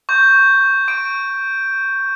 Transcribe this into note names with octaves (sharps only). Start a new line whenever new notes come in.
C#6 G6
C#6 D7